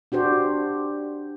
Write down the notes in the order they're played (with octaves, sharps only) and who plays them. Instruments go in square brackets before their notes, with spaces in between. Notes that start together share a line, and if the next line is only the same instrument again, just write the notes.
[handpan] D4 F#4 G4 C5